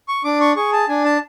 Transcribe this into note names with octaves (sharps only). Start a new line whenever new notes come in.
C#6
D4 D6
C#6
G#4 C#6
A5
D4 G#5
A5